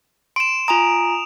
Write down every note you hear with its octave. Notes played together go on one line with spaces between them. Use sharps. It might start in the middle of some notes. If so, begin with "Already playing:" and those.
C6 D7 E7
F4 G#5 A#5 D#6 F7